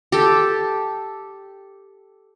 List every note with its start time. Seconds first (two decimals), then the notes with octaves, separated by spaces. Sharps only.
0.12 G4 A4